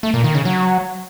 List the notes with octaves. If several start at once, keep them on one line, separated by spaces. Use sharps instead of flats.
A3
A#2
D#3
C#3
F#3